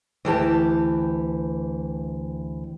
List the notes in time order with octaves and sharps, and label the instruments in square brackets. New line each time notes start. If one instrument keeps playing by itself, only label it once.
[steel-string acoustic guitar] D2 E3 G4 A5